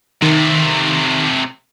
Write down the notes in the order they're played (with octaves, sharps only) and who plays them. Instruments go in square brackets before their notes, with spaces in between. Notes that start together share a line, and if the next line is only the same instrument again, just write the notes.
[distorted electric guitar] C3 A3 [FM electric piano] D#3